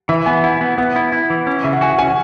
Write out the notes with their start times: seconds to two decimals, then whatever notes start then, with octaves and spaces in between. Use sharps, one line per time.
0.09 E3 E5
0.26 B3 G#5
0.44 E4 F#5
0.61 B3
0.78 B3 F#5
0.96 E4
1.12 E4
1.30 E3
1.47 C#4
1.64 C#3 E5
1.73 F#5
1.81 F#4 G#5
1.90 F#5
1.99 C#4 G#5
2.07 F#5